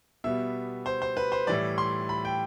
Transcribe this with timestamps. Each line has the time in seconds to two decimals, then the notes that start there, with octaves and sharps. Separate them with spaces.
0.24 B2 G3 B3 E5
0.86 C5
1.02 C5
1.17 B4
1.32 C5
1.47 A2 E3 G3 D5
1.78 C6
2.09 B5
2.25 G5